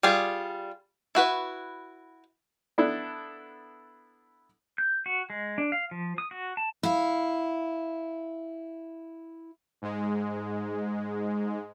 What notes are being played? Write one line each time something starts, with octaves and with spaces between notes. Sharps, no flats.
G3 F4 G#4
E4 F#4 B4
B3 D4 E4 A4
G6
F#4
G#3
D4
F5
F3
D#6
F#4
A5
E4 F5
G#2 G#3